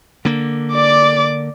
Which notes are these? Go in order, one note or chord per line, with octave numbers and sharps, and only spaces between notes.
D3 A#3
D5 D6